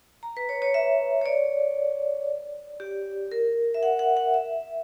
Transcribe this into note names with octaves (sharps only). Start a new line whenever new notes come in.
A#5
B4
C#5
C#5
E5
C#5
D5
G4
A#4
E5
F#5
F#5
F#5
E5